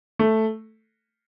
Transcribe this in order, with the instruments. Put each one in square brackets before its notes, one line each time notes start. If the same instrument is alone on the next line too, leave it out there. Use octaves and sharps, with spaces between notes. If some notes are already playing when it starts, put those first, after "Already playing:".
[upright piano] A3